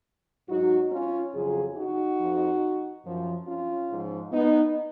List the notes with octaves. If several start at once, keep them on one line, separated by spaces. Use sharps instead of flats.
G#2 F#3 D#4 F#4
C#4 F4
F2 C#3 F#3 F4 G#4
D#4 F#4
F2 F3
F#2 F3
C#4 F4
G#2 F3
B3 D#4